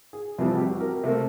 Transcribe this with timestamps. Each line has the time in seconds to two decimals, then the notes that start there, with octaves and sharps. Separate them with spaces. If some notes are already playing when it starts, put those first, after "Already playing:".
0.13 G#4
0.38 F2 C3 E3 G3
0.55 F#4 G4
0.81 A#4
1.04 C3 A3 A#3